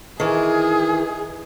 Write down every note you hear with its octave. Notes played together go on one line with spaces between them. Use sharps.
D#3 E3 G#4